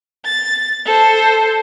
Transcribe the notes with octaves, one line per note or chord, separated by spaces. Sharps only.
A6
A4 C5